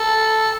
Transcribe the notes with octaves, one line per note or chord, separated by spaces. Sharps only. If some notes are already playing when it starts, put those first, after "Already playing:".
Already playing: A4